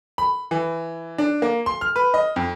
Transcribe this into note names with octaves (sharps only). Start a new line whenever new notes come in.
B5
E3
D4
A#3
C6
F6
B4
D#5
F2